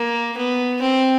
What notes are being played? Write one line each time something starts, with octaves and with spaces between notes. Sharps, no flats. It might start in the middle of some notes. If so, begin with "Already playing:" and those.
Already playing: A#3
B3
C4